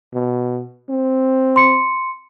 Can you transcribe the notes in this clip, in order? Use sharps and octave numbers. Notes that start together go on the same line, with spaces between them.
B2
C4
C6 C#7